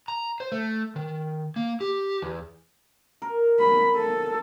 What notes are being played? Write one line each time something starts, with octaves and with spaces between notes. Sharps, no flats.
A#5
C5
A3
D#3
A#3
G4
E2
A#4
B5
A4